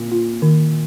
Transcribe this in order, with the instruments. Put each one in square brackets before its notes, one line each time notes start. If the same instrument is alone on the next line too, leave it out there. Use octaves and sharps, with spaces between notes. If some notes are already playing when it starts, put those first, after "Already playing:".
Already playing: [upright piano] A#2
[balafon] F4
D#3